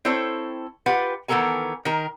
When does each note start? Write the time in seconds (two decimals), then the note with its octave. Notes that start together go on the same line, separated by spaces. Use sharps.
0.05 C4 E4 A4 C5 C#5
0.86 F4 G4 B4 F#5
1.28 D#3 E3 B3 A4 A#4 G#5
1.85 D#3 A#4